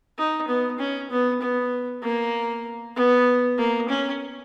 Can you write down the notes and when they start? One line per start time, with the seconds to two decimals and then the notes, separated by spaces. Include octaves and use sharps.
0.18 D#4
0.48 B3
0.79 C#4
1.11 B3
1.42 B3
2.03 A#3
2.96 B3
3.58 A#3
3.89 C#4